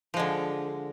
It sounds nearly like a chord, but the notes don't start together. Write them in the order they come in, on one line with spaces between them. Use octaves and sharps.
F3 G#3 D3